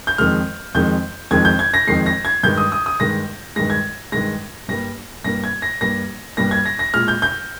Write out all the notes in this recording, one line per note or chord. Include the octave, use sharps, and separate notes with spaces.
G6
F2 D#3 G#3 F6
F2 D#3 G#3 G6
F2 D#3 G#3 G#6
G6
G#6
A#6
F2 D#3 G#3 C7
A#6
G#6
G2 D#3 G#3 G6
D#6
D#6
D#6
G2 D#3 G#3 A#6
G2 D#3 G#3 A#6
G#6
G2 D#3 G#3 A#6
G2 G3 A#3 A#6
G2 G3 A#3 A#6
G#6
A#6
G2 G3 A#3 A#6
G2 G3 A#3 A#6
G#6
A#6
A#6
A#2 G#3 F6
G6
G6